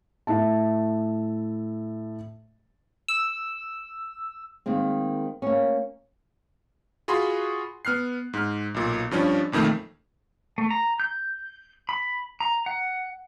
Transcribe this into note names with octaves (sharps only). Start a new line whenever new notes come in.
A2 E5 A5
E6
D#3 G#3 A#3 C4
A#3 C#4
F4 F#4 G#4 B5 C6
B3 F6 F#6 C7
G#2 F6
B1 A#2
G2 F3 C#4 D4
B1 F2 D#3 A3 A#3
A3
A#5
G6
B5
A#5
F#5